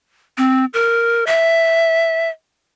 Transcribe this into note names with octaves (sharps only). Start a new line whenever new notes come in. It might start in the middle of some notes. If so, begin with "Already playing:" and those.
C4
A#4
E5